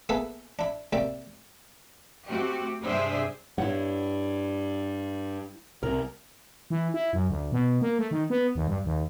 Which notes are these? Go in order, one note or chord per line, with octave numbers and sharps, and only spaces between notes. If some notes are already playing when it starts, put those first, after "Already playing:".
A#3 B3 G#4 A4 B4 E5
D4 E4
C2 A#3 G4 D5 E5
A3 C4 F#4 G4
G2 C3 D4 G#4 C5 E5
G2 E4 C#5 F#5
C2 C3 A#4
E3
E4
F#2
D2
B2
A#3
A3
D#3
B3
D#2
G2
D#2